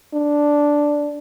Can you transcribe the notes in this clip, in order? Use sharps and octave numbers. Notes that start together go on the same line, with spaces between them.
D4